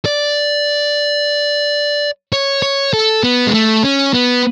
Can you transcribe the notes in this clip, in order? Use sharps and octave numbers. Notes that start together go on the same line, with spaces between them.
D5
C#5
C#5
A4
B3
G#3
A3
C#4
B3